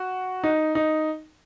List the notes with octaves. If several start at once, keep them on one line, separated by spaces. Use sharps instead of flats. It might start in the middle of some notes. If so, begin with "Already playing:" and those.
Already playing: F#4
D#4
D#4